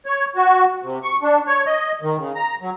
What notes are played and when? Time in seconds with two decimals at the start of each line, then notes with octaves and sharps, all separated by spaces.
0.06 C#5
0.36 F#4
0.83 C3
1.03 C#6
1.22 D4
1.47 C#5
1.66 D#5
2.02 D#3
2.17 C#3
2.35 A#5
2.61 F#3